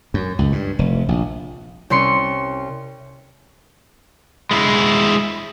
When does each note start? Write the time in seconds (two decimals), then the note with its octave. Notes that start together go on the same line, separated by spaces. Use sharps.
0.14 F#2
0.39 C#2
0.52 G2
0.79 F1
1.09 A#1
1.90 C2 C#4 C6 C#7
4.51 G#3 E4